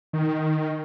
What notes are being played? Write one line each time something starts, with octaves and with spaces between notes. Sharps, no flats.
D#3